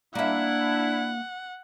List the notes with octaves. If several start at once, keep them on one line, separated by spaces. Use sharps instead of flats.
A#3 D4 E4 E5 F#5